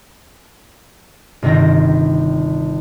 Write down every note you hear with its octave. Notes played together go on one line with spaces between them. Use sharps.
G1 C3 D#3 G5 A#6